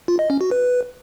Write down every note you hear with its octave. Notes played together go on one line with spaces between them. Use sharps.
F4
D#5
C#4
F#4
B4